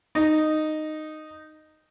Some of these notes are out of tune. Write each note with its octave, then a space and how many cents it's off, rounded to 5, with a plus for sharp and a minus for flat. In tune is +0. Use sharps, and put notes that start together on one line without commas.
D#4 -10